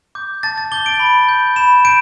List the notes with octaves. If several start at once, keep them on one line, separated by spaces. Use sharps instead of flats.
D6 G6
A5 A6
A6
D6 G6 G7
D7
B5
G6
B5 E7
G6 D7